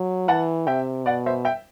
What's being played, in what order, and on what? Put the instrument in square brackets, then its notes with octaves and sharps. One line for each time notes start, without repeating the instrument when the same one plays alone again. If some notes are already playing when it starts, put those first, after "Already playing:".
Already playing: [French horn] F#3
[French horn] E3 [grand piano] F#5 A5
[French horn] C3 [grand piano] E5 G5
[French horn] B2 [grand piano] D5 F#5
[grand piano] C5 E5
E5 G5